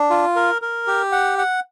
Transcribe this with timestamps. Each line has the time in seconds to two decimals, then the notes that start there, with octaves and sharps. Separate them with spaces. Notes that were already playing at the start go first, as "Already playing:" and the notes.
Already playing: D4
0.10 F4
0.36 A#4
0.62 A#4
0.87 G4
1.12 F#5
1.38 F#5